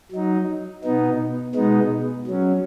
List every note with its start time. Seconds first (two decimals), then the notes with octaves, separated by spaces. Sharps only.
0.11 F#3 D#4
0.84 B2 B3 D#4
1.55 B2 G#3 B3 D#4
2.27 F#3 C#4